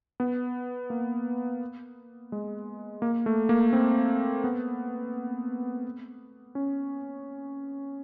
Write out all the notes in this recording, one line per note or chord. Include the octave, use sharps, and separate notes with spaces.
B3
A#3
G#3
A#3
A3
A#3
C4
B3
C#4